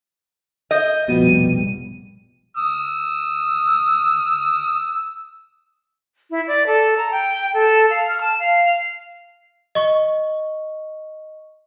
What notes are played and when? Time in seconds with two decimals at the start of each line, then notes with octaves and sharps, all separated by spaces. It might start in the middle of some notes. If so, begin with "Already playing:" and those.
0.71 D#5 G6
1.08 F1 A#1 B2 F3 G3 B3 D#7
2.57 D#6 E6
6.31 E4
6.47 D5
6.67 A4
6.97 A#5
7.12 G5
7.54 A4
7.90 F5
8.08 F6
8.21 A5
8.40 F5
9.75 D#5 C#6